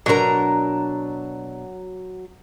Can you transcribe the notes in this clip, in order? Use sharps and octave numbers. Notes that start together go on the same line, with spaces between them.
B2 F#3 D4 A#4 A#5